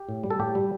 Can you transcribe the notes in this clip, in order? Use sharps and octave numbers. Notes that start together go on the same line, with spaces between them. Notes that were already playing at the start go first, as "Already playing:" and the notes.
Already playing: G4
A2
G3
A4
A2 G4
G3